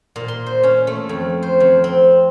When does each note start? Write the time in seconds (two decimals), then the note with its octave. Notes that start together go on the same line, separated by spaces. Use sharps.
0.16 A#2
0.28 C6
0.46 C5
0.63 C#4
0.87 A3
1.09 F2
1.43 C5
1.60 F2
1.84 C4